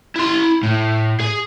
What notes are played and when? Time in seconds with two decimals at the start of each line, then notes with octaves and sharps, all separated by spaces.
0.16 E4 C6
0.63 A2
1.21 G#4